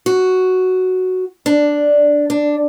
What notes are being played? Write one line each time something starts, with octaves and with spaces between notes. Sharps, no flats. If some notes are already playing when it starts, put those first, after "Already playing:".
F#4
D4
D4